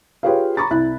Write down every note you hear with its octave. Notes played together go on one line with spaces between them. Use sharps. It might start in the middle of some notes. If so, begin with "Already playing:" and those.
F4 G4 G#4 B4 C#5 F5
A#5 B5 C#6 D6 A6
C2 E4 B5 F#6